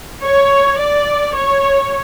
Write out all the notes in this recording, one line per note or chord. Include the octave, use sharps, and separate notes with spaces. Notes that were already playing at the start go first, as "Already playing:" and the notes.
C#5
D5
C#5